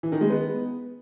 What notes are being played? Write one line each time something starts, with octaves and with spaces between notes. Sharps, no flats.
E3
D#3
G#3
B3